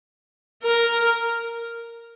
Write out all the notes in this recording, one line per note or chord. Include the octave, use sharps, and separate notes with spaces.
A#4